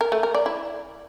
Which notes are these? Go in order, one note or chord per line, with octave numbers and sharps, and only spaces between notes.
A#4
A3
A#4
D5
E4